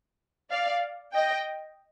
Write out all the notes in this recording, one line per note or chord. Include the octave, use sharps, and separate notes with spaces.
D5 F5
D#5 G5